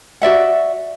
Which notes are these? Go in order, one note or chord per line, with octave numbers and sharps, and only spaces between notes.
F#4 D5 E5 F#5